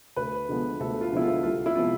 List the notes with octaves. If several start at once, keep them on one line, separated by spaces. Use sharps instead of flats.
D2 B4
D3 F3 G#3 B3
D2 A4
F4
D3 F3 G#3 B3 E4
F4
C2 F4
E4
C3 F3 G#3 B3 F4